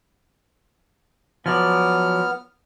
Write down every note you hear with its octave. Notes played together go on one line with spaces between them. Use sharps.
F3 F#3 B3 D5 F6